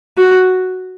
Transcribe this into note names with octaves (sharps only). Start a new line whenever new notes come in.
F#4